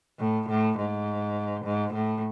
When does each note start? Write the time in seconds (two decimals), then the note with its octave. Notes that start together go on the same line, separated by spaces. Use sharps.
0.19 A2
0.49 A2
0.78 G#2
1.65 G#2
1.94 A2